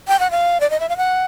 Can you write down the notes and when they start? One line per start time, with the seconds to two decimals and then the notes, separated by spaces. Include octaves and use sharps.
0.08 G5
0.19 F#5
0.31 F5
0.60 D5
0.70 D#5
0.80 E5
0.89 F5
0.97 F#5